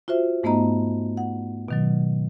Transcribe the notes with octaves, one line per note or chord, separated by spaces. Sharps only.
F4 F#4 C5 E5
G#2 A3 B3 D#4 D#5 A#5
F#5
B2 D#3 F#3